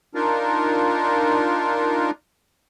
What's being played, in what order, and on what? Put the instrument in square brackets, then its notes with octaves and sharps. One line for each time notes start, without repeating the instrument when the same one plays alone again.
[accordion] D4 D#4 F4 A#4